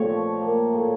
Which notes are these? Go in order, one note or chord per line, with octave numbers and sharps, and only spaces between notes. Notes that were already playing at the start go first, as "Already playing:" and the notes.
Already playing: A#2 A3 C4 C#5
F3
A#3
A2